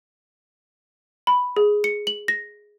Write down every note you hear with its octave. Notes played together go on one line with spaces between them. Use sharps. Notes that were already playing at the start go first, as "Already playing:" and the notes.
B5
G#4
C#7
F#7
A#6